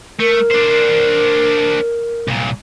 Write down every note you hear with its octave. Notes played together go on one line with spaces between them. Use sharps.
A3 A#4
D4 C5
C2 A#2